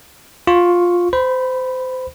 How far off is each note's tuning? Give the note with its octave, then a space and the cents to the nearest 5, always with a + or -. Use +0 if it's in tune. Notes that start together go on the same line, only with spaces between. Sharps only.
F4 +10 C#6 +0
C5 -25 B5 +0